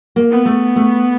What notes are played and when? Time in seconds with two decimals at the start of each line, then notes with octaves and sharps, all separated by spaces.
0.16 A#3
0.31 B3
0.45 A3
0.76 A3